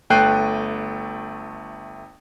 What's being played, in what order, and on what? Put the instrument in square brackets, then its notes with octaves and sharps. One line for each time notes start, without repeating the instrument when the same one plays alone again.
[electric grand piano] G1 A3 G5 F#6 C7 D#7